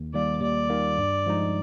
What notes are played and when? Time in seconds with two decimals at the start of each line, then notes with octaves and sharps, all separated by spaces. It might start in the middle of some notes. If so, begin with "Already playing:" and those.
Already playing: D#2
0.14 D#3 G3 A#3 D5
0.42 D#2 D5
0.70 D#3 G3 A#3
0.98 G2
1.26 F3 G#3 D#4